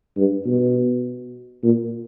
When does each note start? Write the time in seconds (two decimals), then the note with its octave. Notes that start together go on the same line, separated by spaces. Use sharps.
0.17 G2
0.46 B2
1.64 A#2